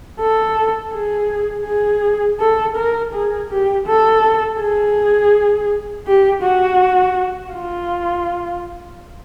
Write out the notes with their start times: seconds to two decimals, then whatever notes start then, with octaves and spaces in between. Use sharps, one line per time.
0.20 A4
0.94 G#4
1.66 G#4
2.40 A4
2.77 A#4
3.14 G#4
3.50 G4
3.87 A4
4.60 G#4
6.07 G4
6.43 F#4
7.53 F4